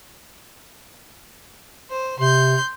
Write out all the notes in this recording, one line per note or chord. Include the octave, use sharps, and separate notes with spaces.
C5
C3 C6 G6